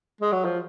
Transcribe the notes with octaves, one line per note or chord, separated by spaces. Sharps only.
G#3
F#3
F3